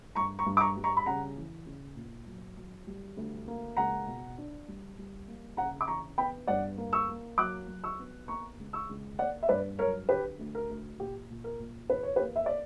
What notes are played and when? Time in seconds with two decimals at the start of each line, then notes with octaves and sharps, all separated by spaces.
0.15 G2 A#5 C#6
0.39 A#5 C#6
0.46 G2
0.57 D6
0.61 A#5 C#6
0.77 G3
0.84 A#5 C#6
0.97 B5
1.06 C#3 F#5 A#5
1.37 E3
1.66 C#3
1.96 A#2
2.27 F#3
2.57 F#3
2.87 G3
3.17 D2
3.48 A#3
3.77 C#2 F#5 A#5
4.07 B2
4.38 D4
4.68 G3
4.98 G3
5.28 A#3
5.57 C#3 F#5 A#5
5.81 D6
5.88 E3 A#5 C#6
6.18 B3 G5 B5
6.47 G2 D5 F#5
6.78 A#3
6.93 C#6 E6
7.08 A#3
7.38 F#3 D6 F#6
7.68 F#3
7.84 C#6 E6
7.99 B3
8.28 A#3 A#5 C#6
8.59 C#2
8.73 C#6 E6
8.89 C#2
9.19 A#3 D5 F#5
9.43 E5
9.49 G2 B4 D5
9.79 F#3 A#4 C#5
10.09 D3 G4 B4
10.39 D2
10.55 A#4
10.70 D2
10.99 A#2 G4
11.30 A#2
11.44 A#4
11.59 A#2
11.90 E2 B4
12.03 C#5
12.16 G4 B4
12.21 A#3
12.36 E5
12.46 D5